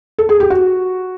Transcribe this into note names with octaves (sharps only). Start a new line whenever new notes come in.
A4
G#4
G4
F#4